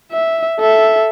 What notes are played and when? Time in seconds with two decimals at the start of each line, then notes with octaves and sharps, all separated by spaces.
0.12 E5
0.60 A4 E5